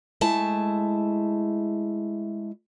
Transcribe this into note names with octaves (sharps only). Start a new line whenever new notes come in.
G#3 A3 E4 A5